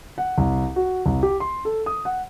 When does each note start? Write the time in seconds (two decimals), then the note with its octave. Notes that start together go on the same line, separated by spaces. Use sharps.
0.18 F#5
0.38 C2
0.76 F#4
1.06 C2
1.23 G4
1.40 C6
1.65 A4
1.86 D#6
2.05 F#5